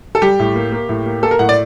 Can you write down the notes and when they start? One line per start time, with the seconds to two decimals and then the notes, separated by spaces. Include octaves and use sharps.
0.15 A4
0.22 G3 G4
0.39 A2
0.56 A#3
0.72 A#3
0.89 A2
1.06 A#3
1.22 A#3 A4
1.31 A#4
1.39 A2 F#5
1.49 D5